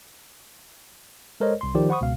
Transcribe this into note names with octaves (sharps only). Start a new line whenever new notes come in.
G#3 A4 A#4 C5 C#5 D#5
C2 C6
D#3 F3 G4 D5
C5 F#5 B5 C#6 D#6
C#2 B2 F5